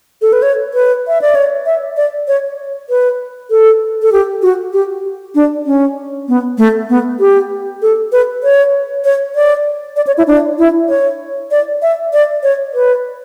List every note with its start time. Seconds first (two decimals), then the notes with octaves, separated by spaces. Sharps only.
0.22 A4
0.33 B4
0.42 C#5
0.74 B4
1.08 E5
1.22 D5
1.35 C#5
1.66 E5
1.97 D5
2.28 C#5
2.90 B4
3.51 A4
4.02 A4
4.12 G4
4.42 F#4
4.73 G4
5.35 D4
5.66 C#4
6.28 B3
6.58 A3
6.89 B3
7.20 G4
7.82 A4
8.12 B4
8.43 C#5
9.05 C#5
9.35 D5
9.96 D5
10.07 C#5
10.18 E4
10.27 D4
10.58 E4
10.89 C#5
11.51 D5
11.82 E5
12.13 D5
12.43 C#5
12.74 B4